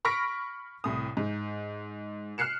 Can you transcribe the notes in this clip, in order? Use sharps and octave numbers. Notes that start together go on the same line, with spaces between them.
B5 C#6 F6 A#6 B6 D7
C2 A2 D#6
G#2
F6 F#6 C7 C#7 E7